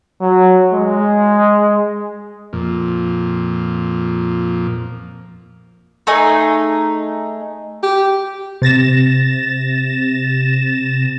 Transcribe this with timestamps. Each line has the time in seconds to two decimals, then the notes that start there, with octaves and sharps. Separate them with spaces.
0.21 F#3
0.73 G#3
2.53 F2 A#2
6.07 A3 D#4 G#4
7.83 G4
8.62 C3 A6 A#6 E7